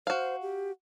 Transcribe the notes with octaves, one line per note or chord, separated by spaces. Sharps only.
F#4 C5 F5
G4